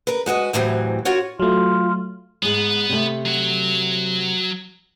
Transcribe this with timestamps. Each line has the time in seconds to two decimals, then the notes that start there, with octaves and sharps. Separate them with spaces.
0.07 A#4 B4
0.26 G#3 F#4 B4 D#5
0.53 D2 A2 C3 E3 F#3 C4
1.05 F4 F#4 A#4 C#5 F#5
1.40 F#3 A3 F4
2.42 G#2 G#3 B3
2.89 C3 A3
3.25 F#3 F#5